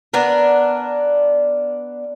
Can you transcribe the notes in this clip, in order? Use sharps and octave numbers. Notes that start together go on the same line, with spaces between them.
B3 D4 A#4